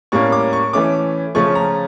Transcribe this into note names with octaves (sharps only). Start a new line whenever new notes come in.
A2 G3 A#3 C#4 C#6
D6
C#6
E3 A3 C#4 D6
C#3 F3 A3 C#4 C#6
A#5